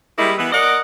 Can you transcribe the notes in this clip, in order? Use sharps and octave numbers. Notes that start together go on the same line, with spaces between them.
G3 G#3 A#3 E4
E3 B3
A#4 D5 D#5 F#5